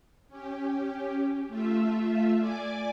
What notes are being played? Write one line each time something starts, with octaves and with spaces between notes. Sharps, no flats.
C#4 G4
A3 F4 E5
D5 G#5 D6